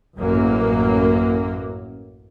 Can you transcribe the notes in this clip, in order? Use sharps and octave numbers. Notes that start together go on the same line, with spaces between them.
A1 F#2 F#3 A#3